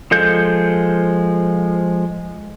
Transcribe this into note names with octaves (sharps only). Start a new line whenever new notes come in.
F3 G#3 A4 G6